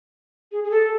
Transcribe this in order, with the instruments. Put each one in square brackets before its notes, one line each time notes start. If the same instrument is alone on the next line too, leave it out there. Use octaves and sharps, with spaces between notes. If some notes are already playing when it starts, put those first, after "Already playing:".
[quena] G#4
G#4
A4